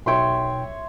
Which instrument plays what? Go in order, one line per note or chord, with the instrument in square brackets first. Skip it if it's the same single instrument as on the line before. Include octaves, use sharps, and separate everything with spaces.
[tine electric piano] B1 F#3 G5 [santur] C#5 E5 C6